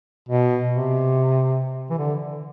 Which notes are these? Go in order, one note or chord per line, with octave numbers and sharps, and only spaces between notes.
B2
C3
E3
D3